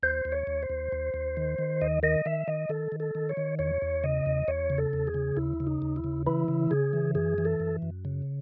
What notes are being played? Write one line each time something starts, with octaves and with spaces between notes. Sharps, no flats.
D#2 C5
D#2
C#5
D#2
C5
D#2
D#2
D#2
D#3
D#3
D#2 D#5
D#3 D#5
D#3 E5
D#3 D#5
D#3 A4
D#3
A4
D#3
C#5
D#3
E2 C#5
E2
C#3 D#5
E2
E2 C#5
C#3
A4
E2
G#4
C#3
D#2 E4
C#3
D#4
D#2
E4
C#3
E3 E4
C#3
C#3 G#4
E3
F#2 G#4
E3
A4
F#2
F#2
C#3